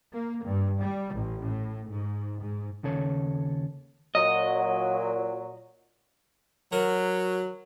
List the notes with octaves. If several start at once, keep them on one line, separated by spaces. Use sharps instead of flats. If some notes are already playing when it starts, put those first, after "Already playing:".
A#3
G2
G3
A1
A2
G#2
G#2
D#2 C#3 A4 C#5
A#2 F#3 D#5
F#3 A#4